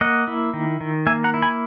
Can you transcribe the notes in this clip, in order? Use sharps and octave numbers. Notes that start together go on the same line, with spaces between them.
A#3 D#5 F#5
E4
D#3
D#3
A#3 E5 G#5
F#5 A#5
E4
G#5 B5